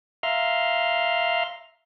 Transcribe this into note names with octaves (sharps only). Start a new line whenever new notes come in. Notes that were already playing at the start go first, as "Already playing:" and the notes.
E5 F5 A#5 C6 F6